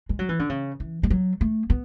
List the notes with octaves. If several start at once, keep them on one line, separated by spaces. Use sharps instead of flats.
G#3
F#3
E3
D3
C#3
E3
G#3
F#3
A3
B3